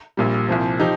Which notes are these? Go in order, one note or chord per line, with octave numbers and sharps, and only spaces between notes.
A#1 A#2 G3
C2 A#2 F3
F3 D#4 G4